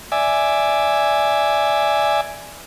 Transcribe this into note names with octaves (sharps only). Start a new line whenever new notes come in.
D5 E5 G#5